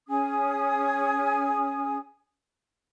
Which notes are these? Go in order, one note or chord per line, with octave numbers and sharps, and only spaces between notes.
C#4 G#4 G#5 D#6